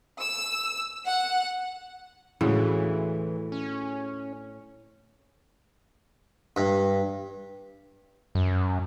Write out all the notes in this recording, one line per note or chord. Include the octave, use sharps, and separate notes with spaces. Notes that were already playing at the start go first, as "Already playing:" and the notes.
E6
F#5
D2 A2 C#3 E3 G#3
C#4
G2
F#2